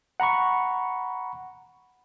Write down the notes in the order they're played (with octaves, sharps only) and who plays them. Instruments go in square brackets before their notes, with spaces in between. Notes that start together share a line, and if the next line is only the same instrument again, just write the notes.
[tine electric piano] F#5 A#5 B5 C#6